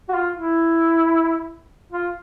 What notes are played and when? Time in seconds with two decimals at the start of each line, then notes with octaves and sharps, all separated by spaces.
0.09 F#4
0.14 F4
0.34 E4
1.92 F4